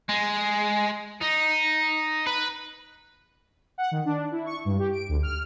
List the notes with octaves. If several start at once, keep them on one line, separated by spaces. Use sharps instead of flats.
G#3
D#4
B4
F#5
D#3
D4
E4
C#6
G2
G4
D7
D2
F6